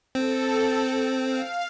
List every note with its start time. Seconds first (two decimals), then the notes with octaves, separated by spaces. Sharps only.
0.15 C4 A4
1.23 F5